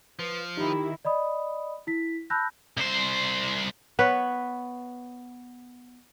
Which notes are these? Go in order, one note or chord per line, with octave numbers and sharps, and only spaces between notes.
F3 B4
D#3 D#4 E4 G4
D5 D#5 B5 D#6
E4 B6
A5 B5 E6 F#6 G6 A#6
C2 C5
B3 B4 C#5